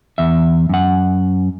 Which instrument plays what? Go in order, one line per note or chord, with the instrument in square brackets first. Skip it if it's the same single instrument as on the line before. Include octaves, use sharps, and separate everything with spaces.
[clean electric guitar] E2 E5
F#2 F#5